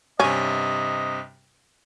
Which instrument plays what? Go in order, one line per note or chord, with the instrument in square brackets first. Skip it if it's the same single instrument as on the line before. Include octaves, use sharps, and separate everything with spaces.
[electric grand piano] G2 C3 [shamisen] C#4 [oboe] D#5